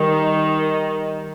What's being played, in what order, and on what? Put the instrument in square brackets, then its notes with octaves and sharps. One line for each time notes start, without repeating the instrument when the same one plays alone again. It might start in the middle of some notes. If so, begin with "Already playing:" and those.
Already playing: [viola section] D#3 [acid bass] G3